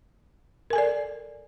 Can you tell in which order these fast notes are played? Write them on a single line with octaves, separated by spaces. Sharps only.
A#4 G#5 A4 D5